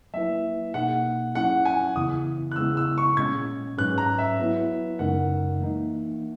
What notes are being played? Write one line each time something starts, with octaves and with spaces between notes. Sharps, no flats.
F#3 A#3 E4 B4 E5
B2 A#3 D#4 G#4 F#5
F#3 C#4 E4 G#4 F#5
G#5
E2 C#3 E3 B3 E4 D#6
F#6
C#3 G#3 B3 E4 G#4 E6
E6
C#6
A#2 G#3 C#4 G#6
G#2 F#3 C#4 G#4 B4 F#6
A#5
E5
F#3 B3 E4 B4
F#2 C#3 G#3 D#4 A#4 F#5
E3 A#3 D#4